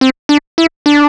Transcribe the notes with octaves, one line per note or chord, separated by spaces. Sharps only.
C4
D4
E4
D4